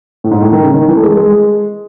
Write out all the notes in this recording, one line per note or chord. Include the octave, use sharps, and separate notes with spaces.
A2
G#2
A2
D#3
C#3
D#3
E3
A3
G#3
G#3